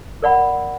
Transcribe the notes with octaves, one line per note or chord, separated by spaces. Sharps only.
A#4 D5 F#5 B5